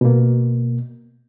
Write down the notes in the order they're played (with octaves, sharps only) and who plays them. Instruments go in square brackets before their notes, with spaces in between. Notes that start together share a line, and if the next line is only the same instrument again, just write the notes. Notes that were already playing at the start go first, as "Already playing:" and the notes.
[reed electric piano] B2 A#3